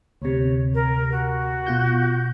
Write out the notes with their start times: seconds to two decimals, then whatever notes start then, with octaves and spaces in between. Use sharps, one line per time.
0.22 D2 C3 C#5
0.74 A#4
1.12 F#4
1.66 B2 F4 G6